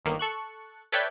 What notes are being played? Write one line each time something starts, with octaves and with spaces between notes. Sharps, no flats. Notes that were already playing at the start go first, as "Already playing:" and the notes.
G1 D#3 A#3
A4 C#6 F#6
A4 B4 C#5 D5 E5 G5